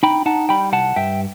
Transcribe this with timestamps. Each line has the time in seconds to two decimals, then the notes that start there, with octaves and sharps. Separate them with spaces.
0.03 D#4 G5 B5
0.26 D#4 F#5 A5
0.49 G3 G5 B5
0.72 C2 F#5 A5
0.96 G2 E5 G5